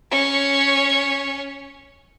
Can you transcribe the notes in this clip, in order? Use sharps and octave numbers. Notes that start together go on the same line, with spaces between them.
C#4 C#5